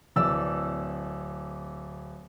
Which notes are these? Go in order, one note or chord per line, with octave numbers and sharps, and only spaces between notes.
D1 E3 D5 E6